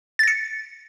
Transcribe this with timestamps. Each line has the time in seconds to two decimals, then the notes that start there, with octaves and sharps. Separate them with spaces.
0.19 A6
0.23 A#6
0.28 C#7